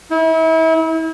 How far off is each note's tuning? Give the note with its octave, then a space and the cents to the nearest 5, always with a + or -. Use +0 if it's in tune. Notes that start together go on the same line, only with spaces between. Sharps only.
E4 -35